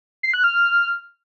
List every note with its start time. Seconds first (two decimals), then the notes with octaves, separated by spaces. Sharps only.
0.23 C7
0.34 F#6
0.44 F6